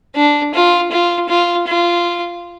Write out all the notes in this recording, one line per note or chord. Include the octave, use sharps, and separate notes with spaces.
D4
F4
F4
F4
F4